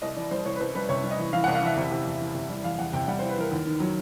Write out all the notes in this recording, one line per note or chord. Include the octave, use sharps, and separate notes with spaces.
C2 D#5
E3 D5
G3 C5
C2 C#5
B4
C2 C5
G3 B4
C3 C#5
G3
D#5
E3
E3 F5
C2 F#5
F5
E3 E5
C3
C3
E2
E3
C3
G3
E2 F5
E2 F#5
C3 G5
G3 F#5
E3 C5
B4
E3 A#4
D#2
D#3
F#3